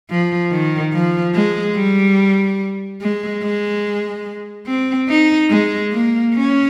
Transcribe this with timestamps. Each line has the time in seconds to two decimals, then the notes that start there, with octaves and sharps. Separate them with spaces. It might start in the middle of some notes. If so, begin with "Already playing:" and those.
0.10 F3
0.52 D#3
0.94 F3
1.35 G#3
1.76 G3
3.02 G#3
3.43 G#3
4.67 C4
5.09 D#4
5.50 G#3
5.92 A#3
6.35 C#4